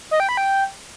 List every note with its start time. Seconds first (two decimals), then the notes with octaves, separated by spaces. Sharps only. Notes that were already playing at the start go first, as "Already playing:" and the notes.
0.11 D#5
0.20 G5
0.29 B5
0.37 G5